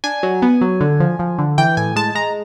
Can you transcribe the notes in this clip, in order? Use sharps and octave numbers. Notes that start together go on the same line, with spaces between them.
D4 G#5
F#3
B3
F#3
D3
F3
F3
D3
E3 G5
A2 G#5
G#3 A5
G#3 A#5